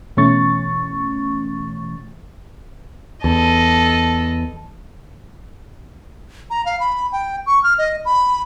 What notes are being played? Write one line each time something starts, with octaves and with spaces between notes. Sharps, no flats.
B2 E3 A3 C#4 C#6 A6
E2 A4 D#5
A#5
F5
B5
G5
C#6
F6
D#5
B5